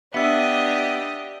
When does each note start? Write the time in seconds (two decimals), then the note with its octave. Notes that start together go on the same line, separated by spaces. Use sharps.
0.14 B3 D4 G4 D#5 E5 E6